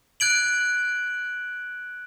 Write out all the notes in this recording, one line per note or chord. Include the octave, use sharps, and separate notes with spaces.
F#6 G#6 D7 F#7